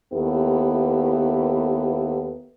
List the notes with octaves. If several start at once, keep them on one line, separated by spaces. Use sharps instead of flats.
D#2 B3 E4 G4 A4